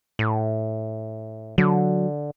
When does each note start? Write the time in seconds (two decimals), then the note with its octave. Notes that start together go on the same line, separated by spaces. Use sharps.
0.19 A2
1.58 D3 F#3